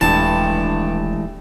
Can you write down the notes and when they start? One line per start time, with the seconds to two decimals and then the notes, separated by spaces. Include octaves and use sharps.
0.01 D#1 G2 E3 G#3 A3 A5